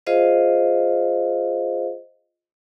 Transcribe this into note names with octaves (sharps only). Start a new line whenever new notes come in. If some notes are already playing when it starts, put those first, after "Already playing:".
F4 G#4 C5 D#5 F5